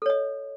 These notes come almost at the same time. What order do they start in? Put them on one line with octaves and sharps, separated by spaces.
A4 C#5 D#5